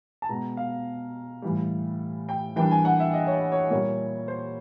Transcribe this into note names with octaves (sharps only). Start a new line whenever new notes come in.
A5
B2 G#3 B3 A#5
F5
A2 E3 G3
G5
E3 G3 A#3 D4 G5
G#5
F#5
E5
D#5
C#5
D5
C#5
A#2 G3 A#3 C#5
C5